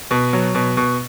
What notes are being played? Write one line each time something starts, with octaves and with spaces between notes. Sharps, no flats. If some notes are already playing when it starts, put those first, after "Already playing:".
B2
F#3
B2
B2